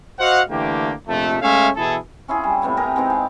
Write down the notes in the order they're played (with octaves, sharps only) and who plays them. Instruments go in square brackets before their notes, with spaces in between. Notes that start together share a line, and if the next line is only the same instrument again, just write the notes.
[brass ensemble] F#4 C5 D#5 F5 F#5
D3 E3 A3 A#3 G4
A#1 F2 C3 A3
G#3 A3 C#4 C#5 E5 F5
B2 E3 E4 G#4 A4
[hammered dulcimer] C#4 E4 F4 G#4
G3
A2 C3 B3 G#5
G4 G#4 A#4 A#5
G#3 B3 C4 D#4
G4 F5